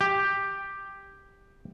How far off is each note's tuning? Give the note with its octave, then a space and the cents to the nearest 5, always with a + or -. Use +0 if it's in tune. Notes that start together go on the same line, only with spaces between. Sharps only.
G4 +5